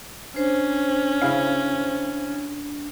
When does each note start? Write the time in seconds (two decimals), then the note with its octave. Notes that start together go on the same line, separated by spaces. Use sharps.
0.36 C#4 D4 C5
1.21 C#3 E4 F5